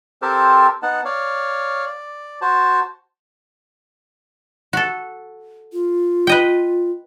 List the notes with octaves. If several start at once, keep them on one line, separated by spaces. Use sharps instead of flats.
C4 G4 A4 A#4 C5 A5
B3 D#4 F#5 A5
C#5 D5 F5
D5
F#4 C5 A5
F#4 A4
F4
B4 D#5 G5